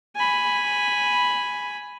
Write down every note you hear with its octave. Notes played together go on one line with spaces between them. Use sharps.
G#5 B5